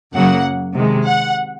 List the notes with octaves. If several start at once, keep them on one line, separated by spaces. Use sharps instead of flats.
F#2 C#3 F#3 A#3 F#5
C3 D#3 G#3
F#5